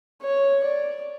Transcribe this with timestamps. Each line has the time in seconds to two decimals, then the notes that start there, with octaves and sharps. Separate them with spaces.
0.22 C#5
0.63 D5